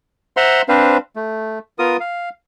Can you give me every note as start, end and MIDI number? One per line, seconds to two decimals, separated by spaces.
0.37 0.62 72
0.37 0.62 76
0.37 0.62 78
0.37 0.62 82
0.37 0.62 84
0.69 0.97 60
0.69 0.97 62
0.69 0.97 71
0.69 0.97 72
0.69 0.97 77
1.16 1.59 57
1.79 1.97 59
1.79 1.97 65
1.79 1.97 70
1.79 1.97 87
2.00 2.29 77